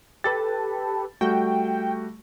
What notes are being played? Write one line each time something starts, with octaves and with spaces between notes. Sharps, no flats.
G4 A4 B4 A6
G3 A3 F#4 G5